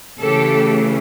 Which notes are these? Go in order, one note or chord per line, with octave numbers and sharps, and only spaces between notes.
C#3 E3 A3 G4 A4